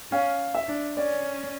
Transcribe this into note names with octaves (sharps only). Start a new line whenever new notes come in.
C#4 F5
E5
D4
C#4 D5